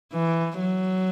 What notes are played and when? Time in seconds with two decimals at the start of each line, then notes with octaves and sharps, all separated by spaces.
0.13 E3
0.59 F#3